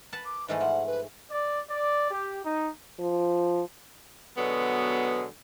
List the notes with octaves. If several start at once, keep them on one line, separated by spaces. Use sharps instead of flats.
B4 F#5 A5
D6
G#2 E3 A3 D#5
F3 F#5
B4
D5
D5
G4
D#4
F3
B2 D3 F#3 G#3 B3